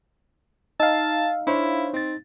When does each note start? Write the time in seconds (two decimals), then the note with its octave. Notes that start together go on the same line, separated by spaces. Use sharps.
0.80 D#4 F5 A5 E6
1.47 D4 E4 C5 C#5
1.94 C4 D#4 A6